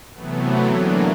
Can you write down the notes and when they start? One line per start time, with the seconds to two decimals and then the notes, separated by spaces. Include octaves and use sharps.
0.13 C3 E3 F#3 A3 B3
0.70 D3 E3 F#3 A#3 D4